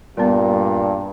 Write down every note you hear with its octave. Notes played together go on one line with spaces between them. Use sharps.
G2 A#2 G3 B3